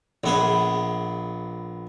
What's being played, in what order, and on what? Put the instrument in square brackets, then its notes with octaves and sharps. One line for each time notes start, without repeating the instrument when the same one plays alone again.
[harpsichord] A#1 B3 G#4